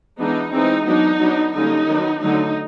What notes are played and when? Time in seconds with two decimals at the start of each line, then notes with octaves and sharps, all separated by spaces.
0.19 E3 G#3 B3 D4 D#4
0.53 E3 G#3 C4 D#4
0.86 F#3 B3 D4 D#4
1.20 F#3 B3 D4
1.54 D3 G3 A#3 C#4 D#4
1.87 D#3 F#3 B3
2.21 D3 F#3 A3 D#4